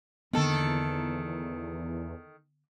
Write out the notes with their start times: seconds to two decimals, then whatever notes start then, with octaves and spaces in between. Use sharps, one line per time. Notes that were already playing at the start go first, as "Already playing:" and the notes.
0.33 E2 D3 D#3 A#3 B3 A4